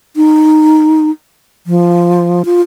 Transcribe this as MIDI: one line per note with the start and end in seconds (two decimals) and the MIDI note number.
0.16 1.11 63
1.67 2.42 53
2.45 2.61 65